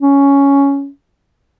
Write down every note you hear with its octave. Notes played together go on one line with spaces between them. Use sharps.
C#4